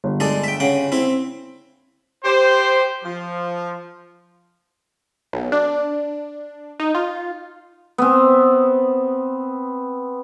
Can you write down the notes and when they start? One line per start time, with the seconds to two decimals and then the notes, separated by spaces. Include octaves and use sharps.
0.04 G1
0.20 G#3 D4 A4
0.44 E5 G5
0.60 C#3 F#5 G5
0.92 C4 E4
2.25 G4 C5
3.04 F3
5.33 B1
5.52 D4
6.80 D#4
6.95 F4
7.98 B3 C4